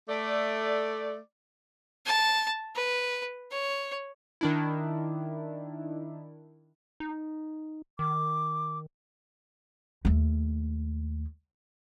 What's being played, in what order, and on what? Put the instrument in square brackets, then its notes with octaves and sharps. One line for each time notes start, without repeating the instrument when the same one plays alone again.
[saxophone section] A3 D5
[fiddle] A5
B4
C#5
[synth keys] D#3 D4 E4
[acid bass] D#4
[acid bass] D#3 [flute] D6
[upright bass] D#2 A3